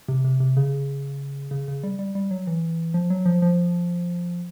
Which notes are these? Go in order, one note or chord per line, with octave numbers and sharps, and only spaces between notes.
C3
C3
C3
C#3
C#3
C#3
G3
G3
G3
F#3
E3
F3
F#3
F3
F3